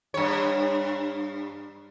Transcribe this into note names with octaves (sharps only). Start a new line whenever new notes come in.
G2 C#5